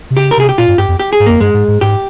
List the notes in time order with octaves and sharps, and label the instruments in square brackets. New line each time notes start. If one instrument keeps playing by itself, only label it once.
[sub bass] C3
[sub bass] C#3 [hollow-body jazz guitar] G4
[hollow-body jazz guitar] A#4
[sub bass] C3 [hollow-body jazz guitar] G#4
[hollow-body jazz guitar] G4
[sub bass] A#2 [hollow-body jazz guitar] F4
[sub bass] G2
[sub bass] G2 [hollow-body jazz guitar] G4
[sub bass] F2
[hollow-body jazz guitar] G4
G#4
[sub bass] G#2
[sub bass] F2 [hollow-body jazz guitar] A#3
[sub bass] G2 [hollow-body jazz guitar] G#3
[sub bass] G#2
G#2
[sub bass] G#2 [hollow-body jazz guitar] G4